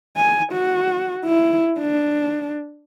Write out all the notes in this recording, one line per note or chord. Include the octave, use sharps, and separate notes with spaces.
G#5
F#4
E4
D4